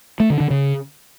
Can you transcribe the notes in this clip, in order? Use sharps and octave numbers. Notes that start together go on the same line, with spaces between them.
A3
D3
D3
C#3